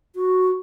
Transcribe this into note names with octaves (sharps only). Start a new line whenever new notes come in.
F#4